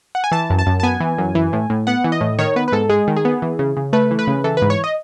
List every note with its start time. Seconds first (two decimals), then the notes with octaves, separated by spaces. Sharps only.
0.15 F#5
0.24 G#5
0.32 E3 A5
0.50 F#2
0.59 A5
0.66 F#2
0.80 A5
0.83 B3 G#5
1.00 E3
1.18 F#2
1.35 E3
1.53 A2
1.70 A2
1.87 B3 F#5
2.04 E3
2.12 D#5
2.21 A2
2.39 D#3 C#5
2.56 B3 B4
2.68 B4
2.72 G#2 A4
2.89 G#3 G#4
3.08 D#3
3.16 G#4
3.25 B3
3.42 E3
3.59 C#3
3.77 C#3
3.93 A3 B4
4.11 E3
4.19 B4
4.27 C#3
4.44 E3 A4
4.57 G#2 B4
4.70 C#5
4.84 D#5